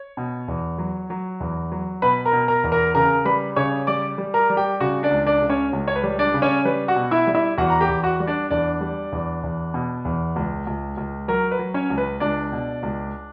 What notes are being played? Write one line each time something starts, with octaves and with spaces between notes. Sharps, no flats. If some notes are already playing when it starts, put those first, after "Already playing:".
Already playing: C#5
B2
E2
F#3
F#3
E2
F#3
B2 B4 B5
A#4 A#5
B2
A#4 A#5
E2
A#4 A#5
C#3 A#4 A#5
G3 B4 B5
C#3 C#5 C#6
G3 D5 D6
G3
A#4 A#5
G3
G4 G5
C#3 F#4 F#5
D4 D5
C#2
D4 D5
C#3
C#4 C#5
C#2
C#5
B4
G3
D4 D5
C#3
C#4 C#5
G3 B4
F#4 F#5
B2
E4 E5
G3
E4 E5
E2 F#4 F#5
A#5
G4 G5
E2
F#4 F#5
G3
D4 D5
E2 D4 D5
G3
E2
E2
B2
E2
C#2
C#2
C#2
F#3 A#4
B4
F#3
C#4 C#5
C#2
B4
C#2 D4 D5
B2
C#2